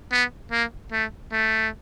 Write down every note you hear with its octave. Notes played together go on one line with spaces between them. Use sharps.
B3
A#3
A3
A3